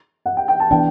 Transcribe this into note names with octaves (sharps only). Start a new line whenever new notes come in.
F#5
G5
G5
A5
E3 B3 D4 G5